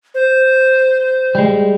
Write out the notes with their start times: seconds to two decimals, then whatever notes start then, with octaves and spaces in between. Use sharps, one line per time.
0.14 C5
1.35 G3 G#3